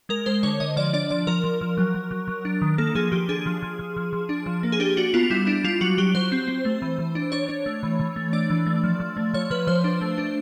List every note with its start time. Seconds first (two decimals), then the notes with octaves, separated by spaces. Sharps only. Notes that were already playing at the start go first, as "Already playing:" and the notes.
0.09 G#3 A#4
0.26 G#3 C5
0.43 D3 C#5
0.60 D3 D#5
0.77 F3 D5
0.93 D4 D5
1.10 F3 D5
1.27 F3 A#4
1.44 F3
1.61 F3
1.78 F#3
1.95 F#3
2.11 F#3
2.28 F#3
2.45 D4
2.62 D#3
2.78 A#3 A4
2.95 F3 G#4
3.12 F3 G4
3.29 D4 G#4
3.46 F3
3.63 F3
3.79 F3
3.96 F3
4.13 F3
4.29 D4
4.46 F3
4.63 A#3
4.72 G#4
4.80 D4 G4
4.97 D4 F#4
5.14 B3 F4
5.30 G3 E4
5.47 D4 E4
5.64 G3 F4
5.81 F#3 F#4
5.98 F#3 G4
6.15 F#3 C5
6.32 C4
6.48 C4
6.65 A3
6.82 E3
6.99 E3
7.15 D4
7.32 D4 C#5
7.49 D4
7.66 A3
7.83 E3
7.99 E3
8.16 A3
8.33 D4 D5
8.50 E3
8.66 A3
8.83 F3
9.00 F3
9.17 A3
9.34 F3 C#5
9.50 F3 B4
9.67 F3 C5
9.84 D4
10.01 A3
10.18 D4